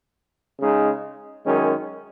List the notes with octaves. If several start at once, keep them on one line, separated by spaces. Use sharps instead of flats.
C#3 G#3 D#4
F#2 D#3 G#3 C#4